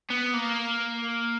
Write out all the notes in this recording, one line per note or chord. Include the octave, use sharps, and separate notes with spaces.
B3
A#3